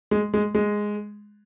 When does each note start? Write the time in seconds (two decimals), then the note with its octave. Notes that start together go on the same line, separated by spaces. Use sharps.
0.11 G#3
0.34 G#3
0.55 G#3